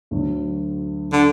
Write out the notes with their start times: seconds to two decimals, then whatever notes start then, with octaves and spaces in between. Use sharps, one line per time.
0.11 D2 D3 F#3
1.13 D3